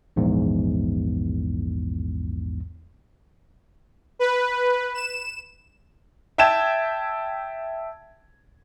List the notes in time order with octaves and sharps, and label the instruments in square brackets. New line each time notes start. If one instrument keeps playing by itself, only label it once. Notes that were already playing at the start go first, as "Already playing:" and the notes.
[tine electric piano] A#1 E2 G#2
[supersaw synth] B4
E7
[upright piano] E5 G5 A5 G#6 E7